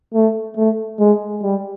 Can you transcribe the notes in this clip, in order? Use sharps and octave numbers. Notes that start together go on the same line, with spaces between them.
A3
A3
G#3
G3